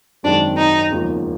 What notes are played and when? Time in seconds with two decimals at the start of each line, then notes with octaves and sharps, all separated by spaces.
0.23 G#1 F#2 D#3 G#3 C4 D4
0.58 D#4
0.92 E1 D#2 C#3 F3